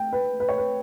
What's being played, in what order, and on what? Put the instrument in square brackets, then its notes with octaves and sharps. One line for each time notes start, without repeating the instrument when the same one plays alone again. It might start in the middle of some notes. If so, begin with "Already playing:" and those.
Already playing: [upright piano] G5
B4
B4
C#5
B4